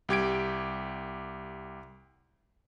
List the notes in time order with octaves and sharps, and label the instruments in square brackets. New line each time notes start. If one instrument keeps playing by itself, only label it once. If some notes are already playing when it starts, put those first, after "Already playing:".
[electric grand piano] C2 G4 G#6 D7